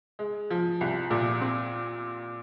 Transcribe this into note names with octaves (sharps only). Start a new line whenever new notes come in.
G#3
F3
C2
A#2
C4